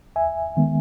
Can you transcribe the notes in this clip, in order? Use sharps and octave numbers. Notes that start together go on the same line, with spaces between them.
D#2 E5 G#5
D#3 G#3 B3